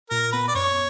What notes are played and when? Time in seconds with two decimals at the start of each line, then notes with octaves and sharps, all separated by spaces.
0.10 A#2 A#4
0.33 B3 B4
0.48 D5
0.55 F#2 C#5